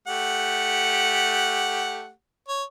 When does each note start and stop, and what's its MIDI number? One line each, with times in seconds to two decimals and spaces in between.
0.07 2.10 57
0.07 2.10 67
0.07 2.10 78
2.48 2.64 73